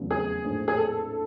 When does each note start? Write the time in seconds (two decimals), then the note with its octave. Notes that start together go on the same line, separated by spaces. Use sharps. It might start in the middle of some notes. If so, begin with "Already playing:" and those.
Already playing: F1 E2 C#3 F#3 A3
0.11 G#4
0.45 A#1 A2 E3 A3 C4
0.68 G#4
0.78 A4